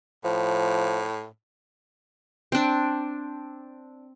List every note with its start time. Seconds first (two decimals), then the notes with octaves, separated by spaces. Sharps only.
0.24 A2 F3
2.52 C4 D4